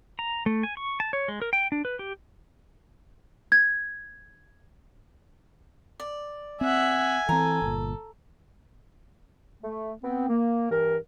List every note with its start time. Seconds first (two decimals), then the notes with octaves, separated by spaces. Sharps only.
0.19 A#5
0.46 A3
0.63 G#5
0.77 C#6
1.00 A5
1.13 C#5
1.28 G#3
1.42 A#4
1.53 G5
1.72 D4
1.85 B4
1.99 G4
3.52 G#6
6.00 D5
6.61 C4 E5 F#5 G#5
7.29 E3 C4 A4 A#5
7.62 G1 A#2
9.63 A3
10.04 B3 C4
10.29 A#3
10.70 G2 E3 A#4